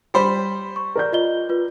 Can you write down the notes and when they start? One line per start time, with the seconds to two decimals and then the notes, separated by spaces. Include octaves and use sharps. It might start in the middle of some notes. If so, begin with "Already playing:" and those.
0.14 G3 C5 B5
0.76 C#6
0.95 A#4 D5 G6
1.13 F4 D#5 G7
1.49 F4 B4